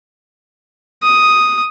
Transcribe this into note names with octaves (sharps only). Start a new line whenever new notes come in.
D#6